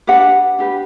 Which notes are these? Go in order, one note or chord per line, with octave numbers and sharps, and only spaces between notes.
D4 G4 B4 F#5
D4 G4 B4